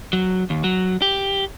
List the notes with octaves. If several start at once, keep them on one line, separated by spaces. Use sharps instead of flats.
F#3
D#2
F#3
G4